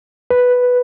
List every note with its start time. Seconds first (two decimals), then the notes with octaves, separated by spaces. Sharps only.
0.31 B4